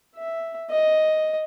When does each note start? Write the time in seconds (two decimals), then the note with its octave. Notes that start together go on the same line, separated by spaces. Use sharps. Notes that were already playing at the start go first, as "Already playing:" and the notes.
0.16 E5
0.71 D#5